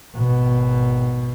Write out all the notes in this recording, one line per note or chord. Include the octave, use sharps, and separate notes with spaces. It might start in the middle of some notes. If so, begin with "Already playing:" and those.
G#1 B2